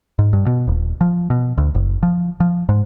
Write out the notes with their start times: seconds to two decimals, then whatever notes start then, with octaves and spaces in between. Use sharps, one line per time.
0.19 G#2
0.33 G2
0.46 B2
0.68 D#1
1.01 F3
1.30 B2
1.58 D2
1.75 F#1
2.03 F3
2.40 F3
2.69 G#2